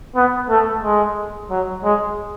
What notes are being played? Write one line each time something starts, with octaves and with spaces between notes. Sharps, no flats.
B3
A3
G#3
F#3
G#3